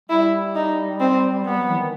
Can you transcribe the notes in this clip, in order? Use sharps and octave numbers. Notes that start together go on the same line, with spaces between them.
G3 E4
D#4
C4
G3 B3
F#3
E3
D#3